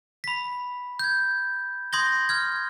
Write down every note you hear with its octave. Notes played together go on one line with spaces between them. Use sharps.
B5 B6
G6 G#6
C6 D#6 G6 G#6 A#6 G7
F6 G#6